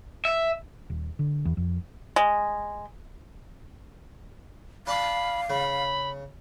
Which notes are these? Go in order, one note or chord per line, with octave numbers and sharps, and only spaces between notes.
E5
D#1
D3
E2
F2
G#3
D4 F5 A5 B5 D6
C#3 B5